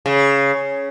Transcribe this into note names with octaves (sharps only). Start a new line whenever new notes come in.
C#3